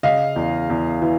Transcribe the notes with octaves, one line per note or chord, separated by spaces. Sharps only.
C#3 D#5 F5
E2
E2
E3